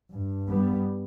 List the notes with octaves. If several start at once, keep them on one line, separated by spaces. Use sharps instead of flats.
G2
G3 B3